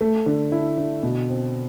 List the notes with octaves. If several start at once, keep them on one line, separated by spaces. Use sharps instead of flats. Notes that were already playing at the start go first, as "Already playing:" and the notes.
A3
D3
E4
D3
B2
C4